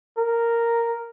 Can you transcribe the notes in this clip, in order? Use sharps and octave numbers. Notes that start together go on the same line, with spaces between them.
A#4